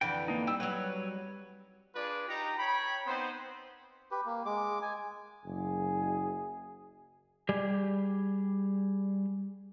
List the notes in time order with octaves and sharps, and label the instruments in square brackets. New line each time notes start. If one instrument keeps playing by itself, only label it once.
[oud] F2 D3 E3 [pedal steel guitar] G5
[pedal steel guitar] A#3 D#4
[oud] G3 [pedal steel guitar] G5 E6
[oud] F#3 G3 [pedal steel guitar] B4 C#5
[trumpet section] D4 F4 G#4 B4 D5
D#4 G4 A#5
C#5 G5 B5
B3 C4 D#4 C5
[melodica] G4 B4
A#3
G#3 D6
G#5
[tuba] F#1 [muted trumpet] G#4
[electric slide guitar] G3 G4 G#4